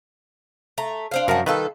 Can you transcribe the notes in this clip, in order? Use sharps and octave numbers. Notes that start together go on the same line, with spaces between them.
A3 A#5
D4 C5 F5
F#2 F3 D4 F#4 A#4
D#3 G3 F4 A4 B4